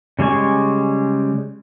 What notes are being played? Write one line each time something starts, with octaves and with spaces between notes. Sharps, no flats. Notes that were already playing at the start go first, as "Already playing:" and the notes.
C#3 G3 G#3 G#5 C#6